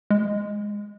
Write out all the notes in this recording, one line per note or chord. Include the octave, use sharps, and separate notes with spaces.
G#3